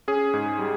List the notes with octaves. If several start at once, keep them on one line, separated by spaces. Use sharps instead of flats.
C#4 G#4
G#2
G3